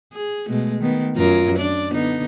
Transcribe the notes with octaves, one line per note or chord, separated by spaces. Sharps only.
G#4
B2 G#3 A3
D#3 B3
F#2 F4 A#4
D4 D5
D3 B3 D#4